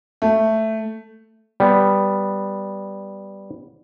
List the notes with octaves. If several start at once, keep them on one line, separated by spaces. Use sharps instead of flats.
A3
G3 B3